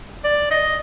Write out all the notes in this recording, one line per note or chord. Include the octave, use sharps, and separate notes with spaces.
D5
D#5